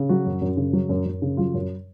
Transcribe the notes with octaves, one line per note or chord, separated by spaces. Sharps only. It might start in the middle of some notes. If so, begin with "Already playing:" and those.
Already playing: C#3
F#3 F#4
F#2
F#2
C#3
F#3
F#2
F#2
C#3
F#3 F4
F#2